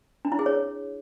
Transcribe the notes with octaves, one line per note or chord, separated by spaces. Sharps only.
D4
E4
G#4
C#5